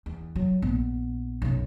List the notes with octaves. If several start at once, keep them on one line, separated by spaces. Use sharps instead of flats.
E2
F#3
A#1 B3
B1 F#2